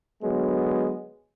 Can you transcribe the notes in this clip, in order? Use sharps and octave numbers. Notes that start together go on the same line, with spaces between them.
D3 F#3 G#3 B3